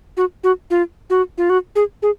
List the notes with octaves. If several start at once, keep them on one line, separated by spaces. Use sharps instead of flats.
F#4
F#4
F4
F#4
F4
F#4
G#4
G#4